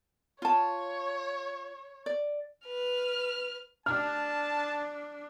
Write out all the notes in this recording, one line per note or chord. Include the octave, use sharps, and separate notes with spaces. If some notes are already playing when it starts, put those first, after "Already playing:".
F4 C#5 A5
D5
B4 F6
D4 A5 F6